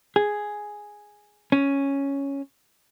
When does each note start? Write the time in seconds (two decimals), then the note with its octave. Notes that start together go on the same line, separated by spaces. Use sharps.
0.16 G#4
1.52 C#4